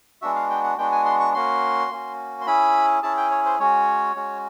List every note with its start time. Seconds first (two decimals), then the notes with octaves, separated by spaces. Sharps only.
0.22 G#3 B3 D4 F#4 E5
0.36 F5
0.50 G5
0.64 F#5
0.78 G#3 B3 D4 F#4 G5
0.92 G#5
1.05 C6
1.20 C#6
1.34 A#3 C#4 F#4 C6
1.91 A#3 C#4 F#4
2.41 C6
2.46 C#4 E4 G#4 B5
3.03 C#4 E4 G#4 A5
3.17 G5
3.31 C#5
3.45 C5
3.59 G#3 C#4 F#4 C#5
4.16 G#3 C#4 F#4